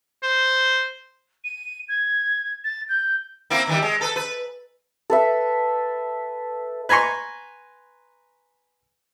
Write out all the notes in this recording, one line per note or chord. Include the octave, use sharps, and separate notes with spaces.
C5
D#7
G#6
A6
G6
A#3 C4 E4
D#3 E3 G3
G#3
A4 B4
B4
A4 B4 E5
B4 G#5 A#5 C6 C#6